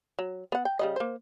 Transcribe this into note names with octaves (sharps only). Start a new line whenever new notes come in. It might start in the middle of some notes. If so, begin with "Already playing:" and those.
F#3
B3 F#5
G5
C#3 G3 D#5
A#3 C5